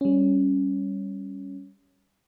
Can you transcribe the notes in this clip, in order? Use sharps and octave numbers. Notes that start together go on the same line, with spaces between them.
G3 C#4